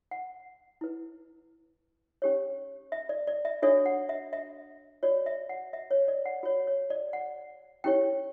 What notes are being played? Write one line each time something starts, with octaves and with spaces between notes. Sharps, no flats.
F#5
E4 B4
C#4 G4 C#5
E5
D5
D5
E5
D4 F#4 A4 C#5 E5
F#5
E5
E5
F#4 C#5 D5
E5
F#5
E5
C#5
D5
F#5
F#4 C#5
C#5
D5
F#5
C#4 E4 G4 C#5 G5